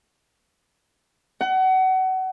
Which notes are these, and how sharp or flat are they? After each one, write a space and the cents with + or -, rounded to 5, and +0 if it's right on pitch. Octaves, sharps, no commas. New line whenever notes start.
F#5 +30